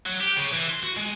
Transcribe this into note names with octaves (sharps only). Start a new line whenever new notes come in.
F#3
G4
C#3
E3
C6
F#4
G#3